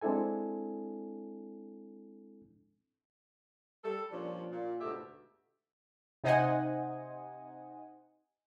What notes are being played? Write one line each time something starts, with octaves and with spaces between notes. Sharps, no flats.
G#3 C4 D4 E4 A4 G#5
G3 A4
A#2 F3 G3 C#4 D4
A#2
D2 G#2 B2 A3 G4 E5
C3 D#4 C5 D#5 F#5 G#5